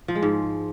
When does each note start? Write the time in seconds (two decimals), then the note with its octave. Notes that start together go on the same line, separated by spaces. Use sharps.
0.08 F3
0.15 G#3
0.22 G#2